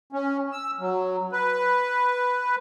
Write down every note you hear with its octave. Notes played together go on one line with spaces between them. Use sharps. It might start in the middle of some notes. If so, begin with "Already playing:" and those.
C#4
E6
F#3
B4